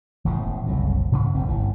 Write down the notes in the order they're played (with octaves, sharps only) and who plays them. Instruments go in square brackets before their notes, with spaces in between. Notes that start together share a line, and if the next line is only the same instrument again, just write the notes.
[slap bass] E1 A1 A2 C#3
F#1 C2 A2
G#2 C#3
F1 G2 C4
G1 C#2 E3